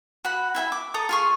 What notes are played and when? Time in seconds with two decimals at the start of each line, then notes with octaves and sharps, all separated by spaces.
0.25 F#4 F#5 B5
0.55 E4 E5 G5 B5
0.72 D6
0.94 A4 A#5 D#6
1.09 F4 G#4 C#6